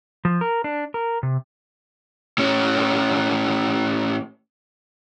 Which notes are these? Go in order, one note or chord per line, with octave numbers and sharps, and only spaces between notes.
F3
A#4
D4
A#4
C3
A2 C#4